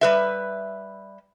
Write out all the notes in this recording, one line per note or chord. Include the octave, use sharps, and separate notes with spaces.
G3 B4 E5